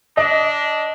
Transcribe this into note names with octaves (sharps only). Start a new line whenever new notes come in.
D4 D#5